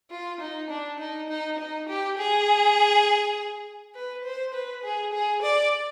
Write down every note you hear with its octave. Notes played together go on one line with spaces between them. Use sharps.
F4
D#4
D4
D#4
D#4
D#4
G4
G#4
B4
C5
B4
G#4
G#4
D5